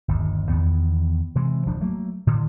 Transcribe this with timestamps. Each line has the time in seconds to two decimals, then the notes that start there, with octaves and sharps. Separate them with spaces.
0.08 G1 D#2
0.50 E2 D#3 B3
1.35 C3 E3 G#3
1.66 D1 F3 D4
1.81 F#3 A3 A#3
2.27 A2 D3 D#3